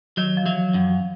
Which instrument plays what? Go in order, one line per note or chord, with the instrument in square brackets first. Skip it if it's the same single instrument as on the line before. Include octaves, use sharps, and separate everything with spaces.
[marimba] D#3 [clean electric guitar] F#3
[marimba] F3
[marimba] E3 [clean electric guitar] F#3
[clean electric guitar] F#2 [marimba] F3